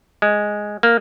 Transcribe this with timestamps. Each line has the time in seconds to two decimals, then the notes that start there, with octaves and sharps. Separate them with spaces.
0.22 G#3
0.83 A#3